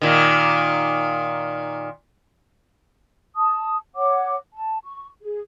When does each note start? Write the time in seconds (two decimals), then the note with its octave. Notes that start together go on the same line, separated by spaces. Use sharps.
0.01 A#2 D#3
3.36 A5 D#6
3.96 C#5 F#5 D6
4.53 A5
4.84 C#6
5.23 G#4